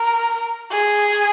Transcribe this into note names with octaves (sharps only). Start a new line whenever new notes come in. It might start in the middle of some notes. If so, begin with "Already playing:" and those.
Already playing: A#4
G#4